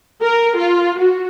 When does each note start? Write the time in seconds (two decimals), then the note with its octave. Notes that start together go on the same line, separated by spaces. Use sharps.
0.23 A#4
0.57 F4
0.98 F#4